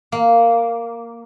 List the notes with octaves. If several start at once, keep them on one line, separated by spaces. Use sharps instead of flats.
A#3